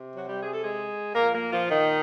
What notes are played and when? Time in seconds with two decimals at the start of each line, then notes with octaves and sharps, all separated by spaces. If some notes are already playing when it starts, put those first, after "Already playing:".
Already playing: C3
0.16 F#3 F#4
0.28 G3 G4
0.41 G#4
0.52 A4
0.63 G#3 G#4
1.14 A#2 F3 A#3 A#4
1.33 A#3 A#4
1.51 F3 F4
1.70 D#3 D#4